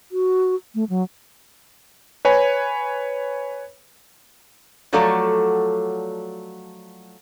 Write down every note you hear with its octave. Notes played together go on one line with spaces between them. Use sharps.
F#4
A3
F#3
B4 C#5 G#5 B5
F3 F#3 A3 A4 C#5 D5